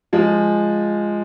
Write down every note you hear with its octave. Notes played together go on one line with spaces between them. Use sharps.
F3 G#3